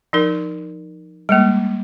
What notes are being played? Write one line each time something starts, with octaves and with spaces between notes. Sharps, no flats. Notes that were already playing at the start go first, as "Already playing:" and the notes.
F3 D#4 A#4
G3 G#3 A#3